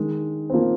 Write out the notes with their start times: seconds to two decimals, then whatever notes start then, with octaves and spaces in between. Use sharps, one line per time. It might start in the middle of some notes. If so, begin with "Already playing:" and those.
Already playing: D#3 G#3
0.50 C4
0.54 F3 A#3